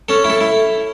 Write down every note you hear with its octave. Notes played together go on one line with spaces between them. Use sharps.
C#4 A4
E4
A4
E4